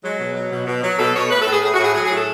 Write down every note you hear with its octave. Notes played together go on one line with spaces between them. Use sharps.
F#3 G#3
B2
F#3
B2
B2
F#3
B2 A4
B2 C#5
A2 B4
A2 A4
G#4
A2 G#4
F#4
A2
G#4
F#3 G#4
G#4
A2
A4